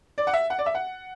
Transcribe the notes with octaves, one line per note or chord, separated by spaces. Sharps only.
D5
F#5
E5
F#5
D5
E5
F#5